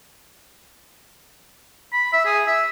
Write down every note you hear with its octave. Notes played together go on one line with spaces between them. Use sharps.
B5
E5
G#4
E5